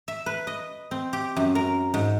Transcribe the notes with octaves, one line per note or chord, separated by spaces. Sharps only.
E5
B4
D#5
C4
G4
F#2
A#4
G#2